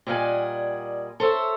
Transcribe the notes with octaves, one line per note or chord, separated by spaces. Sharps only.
A#2 G3 D#5 F5 F#5 G#5
A4 C5 C#5 E5